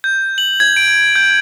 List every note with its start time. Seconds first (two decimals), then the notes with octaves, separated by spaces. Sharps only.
0.04 G6
0.38 F#7
0.60 G#6
0.77 D7
1.16 G6